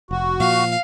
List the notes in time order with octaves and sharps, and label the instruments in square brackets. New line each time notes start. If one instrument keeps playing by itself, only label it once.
[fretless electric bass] F1 [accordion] F#4
[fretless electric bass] A#2 F3 [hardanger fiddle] F5